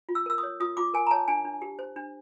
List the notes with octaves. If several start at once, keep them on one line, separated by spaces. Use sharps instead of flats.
F4
E6
A#4 E6
D#6
C#5
F4 D#6
F4 D6
A#4 G#5
A#5
C#5 A5
D4 G#5
D4
G4
C5
D4